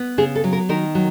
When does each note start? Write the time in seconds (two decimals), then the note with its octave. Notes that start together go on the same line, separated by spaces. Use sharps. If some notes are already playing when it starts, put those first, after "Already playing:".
Already playing: B3
0.18 C#3 G#4
0.35 A4
0.44 F#3
0.53 A#4
0.69 D#3 A#4
0.95 F#3